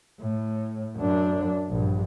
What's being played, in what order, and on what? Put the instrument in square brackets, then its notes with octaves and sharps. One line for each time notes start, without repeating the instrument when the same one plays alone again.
[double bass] A2
F#2 D4
A#1 G2